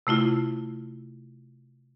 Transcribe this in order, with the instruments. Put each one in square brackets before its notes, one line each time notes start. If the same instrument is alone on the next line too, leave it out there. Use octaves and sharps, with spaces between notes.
[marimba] C3 A3 E4 F4